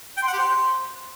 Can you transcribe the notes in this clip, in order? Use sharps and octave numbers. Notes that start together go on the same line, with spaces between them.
G5
C6
F#5
G4
C5